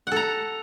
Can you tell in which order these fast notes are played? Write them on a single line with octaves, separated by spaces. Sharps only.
F#5 A4 A#5